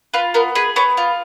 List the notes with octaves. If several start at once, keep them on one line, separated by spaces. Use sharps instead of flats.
F4 B4
B3 A#4
G#4 B4
B3 C#5
F4